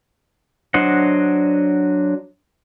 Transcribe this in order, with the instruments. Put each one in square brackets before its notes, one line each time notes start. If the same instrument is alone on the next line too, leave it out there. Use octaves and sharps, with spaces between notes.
[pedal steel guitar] F#3 D4 C5 D#5 F#5